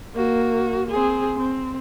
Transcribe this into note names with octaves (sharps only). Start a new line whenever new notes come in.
A#3 F#4
C4 G#4
C4